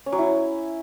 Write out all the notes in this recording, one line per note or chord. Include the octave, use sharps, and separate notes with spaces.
C#4
F#3
E4